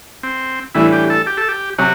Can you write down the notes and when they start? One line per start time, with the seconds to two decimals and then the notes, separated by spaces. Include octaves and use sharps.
0.23 C4
0.74 A2 E3 G3 D4 E4
0.93 G4
1.10 A4
1.27 G4
1.37 A4
1.48 G4
1.78 C3 F#3 F#4